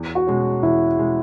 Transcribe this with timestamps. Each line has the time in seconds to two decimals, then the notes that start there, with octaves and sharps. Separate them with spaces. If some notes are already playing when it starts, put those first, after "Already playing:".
Already playing: E2
0.15 F#4
0.27 B2 G#3 C#4
0.63 E2 E4
0.98 B2 G#3 C#4